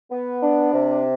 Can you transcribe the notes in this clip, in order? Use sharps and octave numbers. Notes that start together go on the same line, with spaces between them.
B3
D4
C3